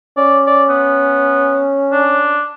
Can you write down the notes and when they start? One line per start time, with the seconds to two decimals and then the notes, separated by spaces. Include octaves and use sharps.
0.17 C#4 D5
0.47 D5
0.69 B3
1.92 D4